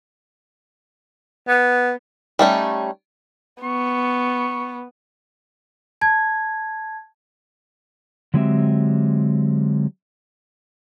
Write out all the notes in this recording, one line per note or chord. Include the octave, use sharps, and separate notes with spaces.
B3
G3 A3 C#4 D#4
B3 C#6
A5 G#6
D3 F#3 G#3 C4 G4 E5